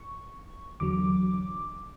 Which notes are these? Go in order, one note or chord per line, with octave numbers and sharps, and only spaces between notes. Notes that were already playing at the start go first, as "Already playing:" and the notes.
Already playing: C#6
E2 D3 F#3 D6